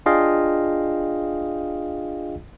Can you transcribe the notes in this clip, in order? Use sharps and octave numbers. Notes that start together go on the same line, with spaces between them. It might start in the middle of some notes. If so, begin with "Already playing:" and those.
D4 F4 G#4 D#5 F5 G5